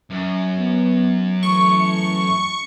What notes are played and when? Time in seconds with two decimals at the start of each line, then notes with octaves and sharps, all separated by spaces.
0.10 F#2
0.58 B3
1.43 E3 A3 C#6